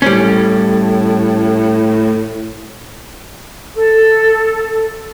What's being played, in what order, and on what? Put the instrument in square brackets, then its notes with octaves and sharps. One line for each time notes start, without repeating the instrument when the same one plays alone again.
[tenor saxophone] A2 [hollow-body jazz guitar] G3 C#4
[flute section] A4